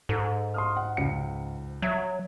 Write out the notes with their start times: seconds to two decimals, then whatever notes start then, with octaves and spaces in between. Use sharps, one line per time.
0.09 G#2 A4
0.54 C6 D#6 F6
0.77 F#5
0.97 C#2 C#7
1.82 F#3 E5 G#6